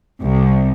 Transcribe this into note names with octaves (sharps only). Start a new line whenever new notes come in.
C2